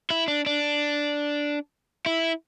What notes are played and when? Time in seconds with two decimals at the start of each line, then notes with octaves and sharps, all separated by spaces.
0.10 E4
0.28 D4
0.46 D4
2.06 E4